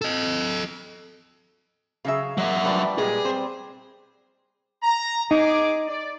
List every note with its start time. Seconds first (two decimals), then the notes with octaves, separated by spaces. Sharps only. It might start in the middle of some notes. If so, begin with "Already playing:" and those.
0.02 A4 D#5
2.05 C#3 F#3 G#4 E5 F5
2.38 F#3 A#3 E5
2.65 F3 G3 A3 B4 D5
2.98 A#2 G#3 G4 G#4
3.25 C4 C5
4.83 A#5
5.31 D#4 G#4 D6
5.87 D5